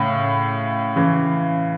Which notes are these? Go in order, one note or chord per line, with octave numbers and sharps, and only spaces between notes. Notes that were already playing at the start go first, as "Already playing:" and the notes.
Already playing: A2 C#3
C#3 E3